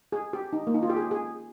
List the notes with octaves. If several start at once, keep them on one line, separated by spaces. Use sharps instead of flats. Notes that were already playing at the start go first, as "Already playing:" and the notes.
G#4
G4
D#4
A#3
D#4
F4
G4
G#4
G#4